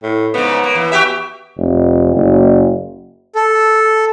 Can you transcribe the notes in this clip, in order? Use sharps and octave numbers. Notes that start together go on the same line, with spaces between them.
A2
G#2 C#3 B3
A#3
E3
F#4 G4 E5
F1
F#1
A4